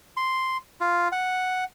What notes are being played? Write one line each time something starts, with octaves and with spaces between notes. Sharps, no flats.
C6
F4
F#5